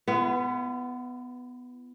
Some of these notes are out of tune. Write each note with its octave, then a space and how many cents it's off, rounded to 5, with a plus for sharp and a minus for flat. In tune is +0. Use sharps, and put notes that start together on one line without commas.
B3 +10 F4 -45 B4 +0